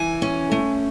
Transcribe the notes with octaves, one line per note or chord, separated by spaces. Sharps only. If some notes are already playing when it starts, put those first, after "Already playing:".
Already playing: E3 G#5
C#4
A3